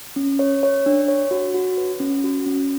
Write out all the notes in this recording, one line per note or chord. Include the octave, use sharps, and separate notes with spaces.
C#4
C#5
C#5
D4
C#5
F#4
F#4
B4
C#4
F#4
C#4